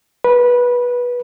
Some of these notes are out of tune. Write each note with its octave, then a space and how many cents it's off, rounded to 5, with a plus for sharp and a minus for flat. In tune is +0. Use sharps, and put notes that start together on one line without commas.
B4 -20